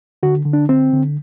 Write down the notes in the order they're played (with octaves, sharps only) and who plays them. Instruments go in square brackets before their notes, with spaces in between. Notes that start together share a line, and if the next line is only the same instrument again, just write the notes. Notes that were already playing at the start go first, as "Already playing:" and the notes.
[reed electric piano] D3 F#4
D3
D4
D3 C4
D3